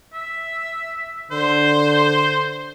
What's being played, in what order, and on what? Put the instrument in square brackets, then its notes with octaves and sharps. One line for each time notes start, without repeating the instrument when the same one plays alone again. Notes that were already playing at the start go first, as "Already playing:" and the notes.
[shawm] E5
[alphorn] D3 [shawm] C5